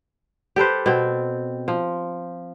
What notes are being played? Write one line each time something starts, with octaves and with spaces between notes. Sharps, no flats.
G4 A4 B4 C5
B2 C4
F3